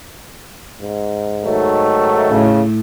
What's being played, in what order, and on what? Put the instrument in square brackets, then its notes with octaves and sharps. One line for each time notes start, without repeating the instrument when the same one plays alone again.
[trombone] G#2
[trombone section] D#3 F#3 A3
[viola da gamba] A2 [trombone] C#3